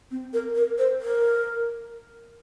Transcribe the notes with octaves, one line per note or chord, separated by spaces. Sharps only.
C4
A#4
A#4
C5
A#4